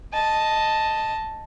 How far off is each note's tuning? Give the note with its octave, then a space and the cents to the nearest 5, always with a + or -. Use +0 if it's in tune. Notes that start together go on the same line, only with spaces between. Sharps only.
D#5 +0 A5 +0